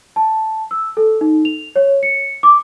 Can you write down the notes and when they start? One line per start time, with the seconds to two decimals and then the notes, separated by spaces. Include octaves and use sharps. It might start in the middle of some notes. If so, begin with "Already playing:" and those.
0.16 A5
0.71 E6
0.97 A4
1.21 D#4
1.45 F7
1.76 C#5
2.03 C#7
2.43 D6